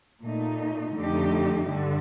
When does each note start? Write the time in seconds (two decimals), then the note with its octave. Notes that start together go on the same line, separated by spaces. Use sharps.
0.24 A#2 A3 D#4
0.97 F2 D3 A3 D#4 G4
1.70 G2 D3